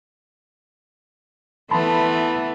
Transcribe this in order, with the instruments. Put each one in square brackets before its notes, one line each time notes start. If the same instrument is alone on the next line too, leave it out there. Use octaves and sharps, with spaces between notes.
[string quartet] E3 A3 B3 [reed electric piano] A5 B5 C6